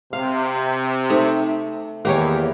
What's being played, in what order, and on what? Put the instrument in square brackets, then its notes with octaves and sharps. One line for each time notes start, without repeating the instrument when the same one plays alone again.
[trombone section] C3 [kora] F5
[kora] A3 [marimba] D#4 C5
[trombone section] E2 [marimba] D#3 [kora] A#3 G4 C#5